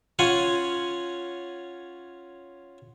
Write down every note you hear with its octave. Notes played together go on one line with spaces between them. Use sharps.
C#4 F4 F#5 G#5